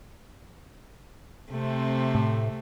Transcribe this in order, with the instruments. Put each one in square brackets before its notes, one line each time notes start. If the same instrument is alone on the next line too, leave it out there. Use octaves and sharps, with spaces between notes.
[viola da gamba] C3 A3 C4
[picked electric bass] A2